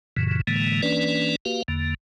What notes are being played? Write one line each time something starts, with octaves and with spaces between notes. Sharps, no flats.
F#2 A#2 C#3 E3
A2 D3 E3 G#3 A#3
E3 A#3 C#4 D4 B4 D5
A#3 F#4 G4 B4 F5
E2 D3 A#3